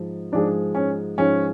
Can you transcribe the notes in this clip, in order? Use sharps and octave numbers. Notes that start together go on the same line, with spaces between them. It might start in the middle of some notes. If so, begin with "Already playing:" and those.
Already playing: G#2 F3 G#3
G#2 F3 G#3 D4
C#4
G#2 F3 G#3 C#4